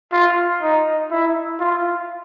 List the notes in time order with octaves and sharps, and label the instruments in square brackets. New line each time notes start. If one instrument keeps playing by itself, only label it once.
[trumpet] F4
D#4
E4
F4